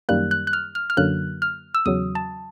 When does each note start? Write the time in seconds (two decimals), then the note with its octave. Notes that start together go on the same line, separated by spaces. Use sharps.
0.09 F#2 D#3 G3 A#3 F#6
0.31 F#6
0.47 F#6
0.53 F6
0.75 F6
0.90 F6
0.97 F#2 D3 F#3 A#3 F#6
1.42 F6
1.75 E6
1.86 E2 C#3 F#3 D#6
2.15 A5